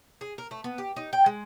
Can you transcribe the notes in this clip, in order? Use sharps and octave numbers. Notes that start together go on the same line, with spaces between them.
G#4
A#4
A3
B3
G4
D#4
G5
G#3